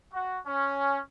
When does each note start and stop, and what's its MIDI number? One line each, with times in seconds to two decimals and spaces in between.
0.13 0.38 66
0.46 1.00 61